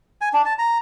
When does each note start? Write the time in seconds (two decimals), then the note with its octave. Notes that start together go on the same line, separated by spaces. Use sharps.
0.21 G#5
0.33 D4
0.45 A5
0.59 A#5